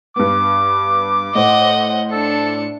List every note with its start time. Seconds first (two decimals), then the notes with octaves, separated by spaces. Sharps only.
0.16 G2 B3 D6
1.35 A2 C5 D#5 F#5
2.12 D4 A4 C#7